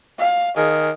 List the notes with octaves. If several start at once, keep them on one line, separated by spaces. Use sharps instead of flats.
F5
D#3 G#4